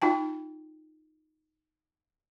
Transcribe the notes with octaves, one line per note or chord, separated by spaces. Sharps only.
D#4 F4 G5 A5